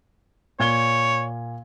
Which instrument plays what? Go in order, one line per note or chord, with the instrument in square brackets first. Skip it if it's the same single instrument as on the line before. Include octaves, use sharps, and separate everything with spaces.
[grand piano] A#2 G#6 G7 [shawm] C#5